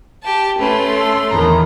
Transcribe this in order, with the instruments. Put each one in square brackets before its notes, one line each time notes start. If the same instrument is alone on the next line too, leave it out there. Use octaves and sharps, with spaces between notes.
[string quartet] G4 A5
[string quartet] A3 C6 [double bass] C#4 [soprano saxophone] B4
[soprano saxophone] A4
[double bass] E2 D#3 [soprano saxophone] A#5